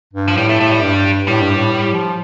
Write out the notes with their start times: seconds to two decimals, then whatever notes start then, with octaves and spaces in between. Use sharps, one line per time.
0.13 G2
0.28 F3
0.37 A2 G3
0.49 A3
0.60 A2 A3
0.71 G3
0.82 G2
1.28 A2 G3
1.42 G2
1.57 A2
1.73 A2
1.94 F3